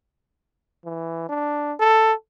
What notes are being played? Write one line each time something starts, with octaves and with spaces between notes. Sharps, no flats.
E3
D4
A4